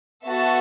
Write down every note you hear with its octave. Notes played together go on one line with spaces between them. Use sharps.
B3 F#4 A4 E5 A5